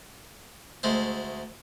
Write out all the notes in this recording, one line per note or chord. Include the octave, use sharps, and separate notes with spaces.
D2 G#3 A3 C5